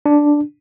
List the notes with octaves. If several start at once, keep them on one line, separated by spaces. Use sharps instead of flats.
D4